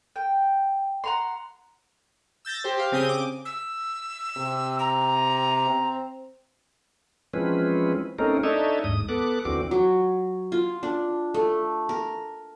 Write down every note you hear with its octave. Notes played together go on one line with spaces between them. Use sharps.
G5
F#5 A#5 C6
E6 G6 A6 A#6
G4 C5
G4 F5
C#3 C4 G#5 D#6 G6 D#7
D6
E6
C3
A#5
C4
E3 F3 G#3 C4 C#4 B4
A3 C4 C#4 D#4 A#4
D4 D#4 A4 C#5 D#5 E5
D#2 G#2 D#6
B3 A4 D6 F#6
D#2 D3 E3 C4 F#4 D6
F#3
F4
D4
A3
A#4